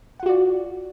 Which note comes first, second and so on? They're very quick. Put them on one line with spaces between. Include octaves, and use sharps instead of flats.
F#5 F4 F#4 D5